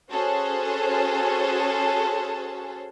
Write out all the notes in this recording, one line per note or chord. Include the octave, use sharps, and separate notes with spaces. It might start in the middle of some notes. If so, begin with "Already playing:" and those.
C#4 F#4 G#4 A4 C5 C#5